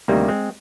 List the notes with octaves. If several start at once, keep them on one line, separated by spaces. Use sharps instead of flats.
D2 C3 D#3 G3 A#3
G#3 C4